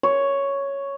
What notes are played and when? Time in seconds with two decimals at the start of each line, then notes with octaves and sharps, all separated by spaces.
0.03 C#5